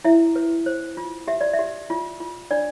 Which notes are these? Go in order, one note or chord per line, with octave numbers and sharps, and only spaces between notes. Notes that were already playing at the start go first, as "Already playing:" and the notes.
E4 E5
B4
C5
F4
G4 E5
D5
E5
G4
F4
F4
D4 D5